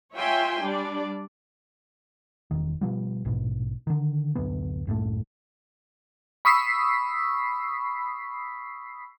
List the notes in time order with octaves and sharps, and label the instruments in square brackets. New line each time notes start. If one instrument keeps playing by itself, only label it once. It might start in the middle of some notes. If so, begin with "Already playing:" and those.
[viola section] F4 C#5 E5 G5 G#5 C6
G3 D4 D5
[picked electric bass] E1 D#3
B2 F3 G3
A#1 G#2 B2
D3 D#3
D1 F#2 D3 B3
C2 F#2 A2 A3
[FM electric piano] B5 C#6 D#6 E6 B6 C7